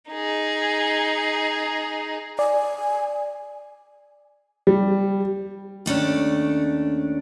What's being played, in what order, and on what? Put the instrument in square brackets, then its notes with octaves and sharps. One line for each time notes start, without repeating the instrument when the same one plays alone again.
[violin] D#4 G#4
[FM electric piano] D5 [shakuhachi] G#5
[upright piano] G3
[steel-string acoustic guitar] D#2 A3 C#4 D4